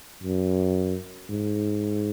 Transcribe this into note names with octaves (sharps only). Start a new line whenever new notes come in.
F#2
G#2